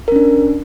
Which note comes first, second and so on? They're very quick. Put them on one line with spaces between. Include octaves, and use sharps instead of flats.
A#4 C#4 D4